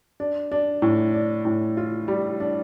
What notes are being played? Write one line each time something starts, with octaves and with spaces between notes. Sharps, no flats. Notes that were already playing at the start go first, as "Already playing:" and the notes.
D4
D4
A2
D4
A2
F4
G3
D4